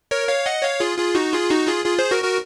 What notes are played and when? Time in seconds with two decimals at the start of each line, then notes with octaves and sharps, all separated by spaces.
0.11 A#4 C#5
0.28 C#5 F5
0.46 D#5 F#5
0.63 C#5 F5
0.80 F4 G#4
0.98 F4 G#4
1.15 D#4 F#4
1.32 F4 G#4
1.50 D#4 F#4
1.67 F4 G#4
1.85 F4 G#4
1.98 G#4 C5
2.11 F#4 A#4
2.24 F#4 A#4